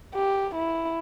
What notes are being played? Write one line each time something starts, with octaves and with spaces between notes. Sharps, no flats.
G4
E4